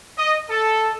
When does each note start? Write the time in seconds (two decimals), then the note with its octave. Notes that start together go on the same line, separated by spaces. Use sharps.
0.18 D#5
0.50 A4